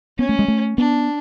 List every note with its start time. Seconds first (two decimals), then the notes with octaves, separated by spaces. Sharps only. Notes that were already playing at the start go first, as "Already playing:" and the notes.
0.18 B3 C#4
0.29 A3
0.39 G#3
0.48 A3
0.78 B3 D4